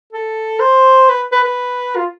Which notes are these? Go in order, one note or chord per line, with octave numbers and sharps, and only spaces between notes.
A4
C5
B4
B4
B4
F4